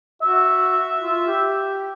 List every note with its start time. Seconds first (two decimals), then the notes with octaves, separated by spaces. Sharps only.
0.22 F#4 E5
1.01 F4
1.27 G4